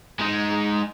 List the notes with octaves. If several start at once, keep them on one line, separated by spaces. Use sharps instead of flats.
G#3 D#4